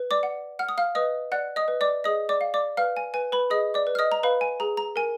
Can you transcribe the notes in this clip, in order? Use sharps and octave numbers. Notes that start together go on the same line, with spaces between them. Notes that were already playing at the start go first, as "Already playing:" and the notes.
Already playing: B4
D5 D6
F#5
F#5 F6
D#6
F5 F6
B4 D#5 D#6
D5 F#5 F#6
D#5 D#6
B4
D5 D6
G#4 D#5 D#6
D5 D6
F5
D5 D6
B4 F5 F6
G#5
B4 G#5
B4 B5
G#4 D#5 D#6
D5 D6
B4
F6
D#5 D#6
A#5
B4 F5 B5
G#5
G#4 A#5
A#5
A#4 G#5